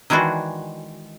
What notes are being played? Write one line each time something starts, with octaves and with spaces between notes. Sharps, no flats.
D#3 E3 G#3 D4 F#4